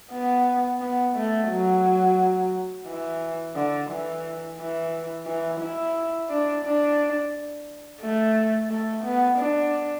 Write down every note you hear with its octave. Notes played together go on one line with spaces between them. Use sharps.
B3
B3
A3
F#3
E3
D3
E3
E3
E3
E4
D4
D4
A3
A3
B3
D4